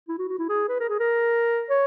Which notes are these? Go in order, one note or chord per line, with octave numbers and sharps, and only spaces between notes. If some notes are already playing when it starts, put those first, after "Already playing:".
E4
F#4
F#4
E4
G#4
B4
A#4
G#4
A#4
C#5